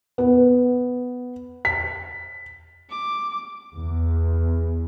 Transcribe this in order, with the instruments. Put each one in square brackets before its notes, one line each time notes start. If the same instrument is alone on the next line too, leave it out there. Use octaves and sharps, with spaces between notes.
[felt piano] B3
B6
[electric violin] D6
[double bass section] E2